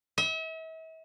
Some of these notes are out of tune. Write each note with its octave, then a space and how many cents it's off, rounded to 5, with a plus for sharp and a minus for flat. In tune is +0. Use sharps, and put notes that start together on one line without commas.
E5 -40